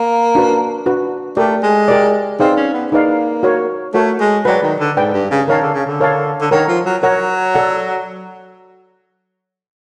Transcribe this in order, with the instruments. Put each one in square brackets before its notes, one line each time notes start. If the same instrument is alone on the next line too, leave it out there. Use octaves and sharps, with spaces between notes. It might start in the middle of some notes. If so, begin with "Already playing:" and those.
Already playing: [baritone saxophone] A#3
[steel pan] D4 F#4 B4
D4 F#4 B4
[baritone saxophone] A3 [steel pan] G4 A#4 D5
[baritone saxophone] G#3
[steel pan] G4 A#4 D5
[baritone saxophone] C4 [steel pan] D#4 G#4 B4 D5 F5
[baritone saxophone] C#4
B3
[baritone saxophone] A#3 [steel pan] D#4 G#4 B4 D5 F5
[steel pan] F#4 A#4 C#5
[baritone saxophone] A3 [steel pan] F#4 A#4 C#5
[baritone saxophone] G#3
[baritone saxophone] F#3 [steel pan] B4 D5 G5
[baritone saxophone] D#3
D3
[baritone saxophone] G#2 [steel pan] B4 D5 G5
[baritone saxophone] G2
C#3
[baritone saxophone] D#3 [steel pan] A#4 C#5 F5 A5
[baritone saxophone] D3
C#3
D3
[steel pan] A#4 C#5 F5 A5
[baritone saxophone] D3
[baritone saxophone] D#3 [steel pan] A#4 C#5 F#5 A#5
[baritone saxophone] F3
F#3
[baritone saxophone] F#3 [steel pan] A#4 C#5 F#5 A#5
[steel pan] A4 D5 F#5